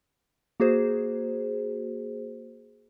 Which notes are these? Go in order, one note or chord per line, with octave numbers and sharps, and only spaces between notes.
A#3 F#4 G#4 C5